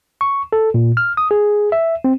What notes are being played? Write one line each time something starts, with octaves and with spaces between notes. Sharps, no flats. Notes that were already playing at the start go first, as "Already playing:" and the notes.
C#6
A4
A#2
F6
D#6
G#4
E5
C4